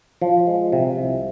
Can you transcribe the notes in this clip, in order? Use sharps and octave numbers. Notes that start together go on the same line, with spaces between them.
F3
G#3
C3
C2